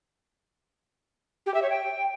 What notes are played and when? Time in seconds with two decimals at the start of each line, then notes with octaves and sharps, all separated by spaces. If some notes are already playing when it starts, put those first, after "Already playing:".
1.46 G4
1.54 E5
1.62 C#5
1.70 G5